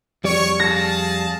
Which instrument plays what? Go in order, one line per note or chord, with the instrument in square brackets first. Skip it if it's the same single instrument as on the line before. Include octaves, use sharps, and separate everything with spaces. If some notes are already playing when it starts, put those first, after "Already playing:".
[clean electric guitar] F2 G3 D5 [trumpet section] C#5 C#6
[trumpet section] G#4 F5 A5 [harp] A#6